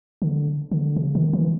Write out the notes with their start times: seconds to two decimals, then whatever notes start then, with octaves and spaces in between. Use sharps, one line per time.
0.22 D3
0.71 D3
0.96 C#3
1.15 D#3
1.33 E3